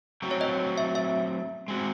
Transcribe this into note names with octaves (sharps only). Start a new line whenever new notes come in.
F#3 A3 C4 F#4
C#5
D#5
E5
E5
G#3 C4 F#4